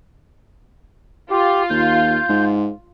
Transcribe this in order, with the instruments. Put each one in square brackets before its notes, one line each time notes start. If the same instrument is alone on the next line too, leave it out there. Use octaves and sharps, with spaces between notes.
[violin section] F4 [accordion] G4
[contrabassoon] D#2 [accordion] G6
[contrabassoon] G#2